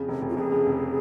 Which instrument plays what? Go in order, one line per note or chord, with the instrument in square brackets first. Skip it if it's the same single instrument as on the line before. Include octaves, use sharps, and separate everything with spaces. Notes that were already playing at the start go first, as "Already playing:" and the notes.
Already playing: [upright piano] F2 C#3
F1
F1
[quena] F4
[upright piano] F2 [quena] G#4
[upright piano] C#3
F1